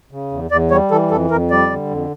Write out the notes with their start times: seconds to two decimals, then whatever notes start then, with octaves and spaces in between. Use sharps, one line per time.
0.11 C#3
0.31 E2
0.51 E2 D5
0.71 G3 C#5
0.91 E3 A4
1.11 F2 A4
1.31 F2 A#4
1.50 G3 D5
1.70 D3
1.90 F2